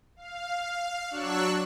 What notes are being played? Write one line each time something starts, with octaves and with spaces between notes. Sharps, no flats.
F5
F#3 D4 C#6 E6 F#6